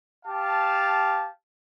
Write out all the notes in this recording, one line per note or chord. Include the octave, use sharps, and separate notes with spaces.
G4 F5 A5